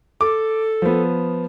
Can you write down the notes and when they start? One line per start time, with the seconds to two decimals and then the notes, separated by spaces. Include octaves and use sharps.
0.21 A4 D6
0.82 F3 B3